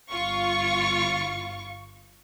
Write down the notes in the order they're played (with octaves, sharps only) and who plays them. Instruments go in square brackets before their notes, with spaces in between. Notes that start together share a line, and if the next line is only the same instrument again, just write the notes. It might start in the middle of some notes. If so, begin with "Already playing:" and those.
[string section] G1 F4 C#6